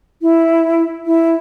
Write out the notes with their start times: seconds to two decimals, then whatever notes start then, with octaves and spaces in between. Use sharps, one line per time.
0.22 E4
1.06 E4